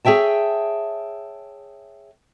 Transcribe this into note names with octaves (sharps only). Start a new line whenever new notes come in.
G#4 C#5 E5 G5 A5